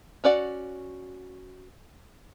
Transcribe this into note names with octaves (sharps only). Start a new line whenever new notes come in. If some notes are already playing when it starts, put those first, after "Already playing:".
C#4 F#4 D5 F#5